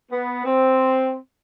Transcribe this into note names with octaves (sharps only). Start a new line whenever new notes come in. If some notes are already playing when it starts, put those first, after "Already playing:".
B3
C4